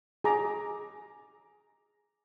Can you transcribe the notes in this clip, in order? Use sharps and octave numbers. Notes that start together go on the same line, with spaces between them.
G#4 A#5 D6